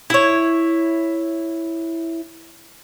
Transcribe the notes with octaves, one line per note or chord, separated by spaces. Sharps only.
E4 C#5